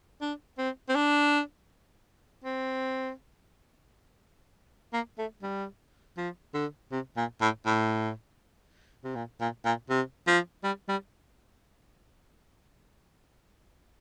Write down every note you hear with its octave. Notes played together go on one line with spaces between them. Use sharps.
D4
C4
C4
D4
C4
A#3
A3
G3
F3
D3
C3
A#2
A2
A2
C3
A#2
A#2
A#2
C3
F3
G3
G3